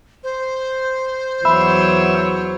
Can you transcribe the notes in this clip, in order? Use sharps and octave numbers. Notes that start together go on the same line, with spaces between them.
C5
E2 F#3 C#5 E5 B5